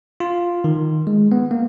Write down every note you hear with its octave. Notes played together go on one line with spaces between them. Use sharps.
F4
D#3
G#3
B3
A#3